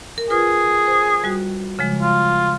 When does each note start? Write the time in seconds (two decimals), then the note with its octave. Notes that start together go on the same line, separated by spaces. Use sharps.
0.18 A#4
0.30 F4 G#4 A#4 B4
0.87 C5
1.24 G3 F#4
1.79 C#3 F3 G#3
2.02 F4